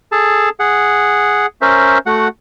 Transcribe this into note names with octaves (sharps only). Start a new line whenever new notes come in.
G#4 A4 A5
G#4 F#5
C#4 A#4 C5 E5
A3 F#4 F#5